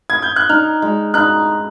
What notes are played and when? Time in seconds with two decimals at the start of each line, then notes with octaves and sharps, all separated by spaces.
0.10 G#6
0.22 G6
0.36 F#6
0.49 D#4 F6
0.82 G#3
1.14 D#4 F#6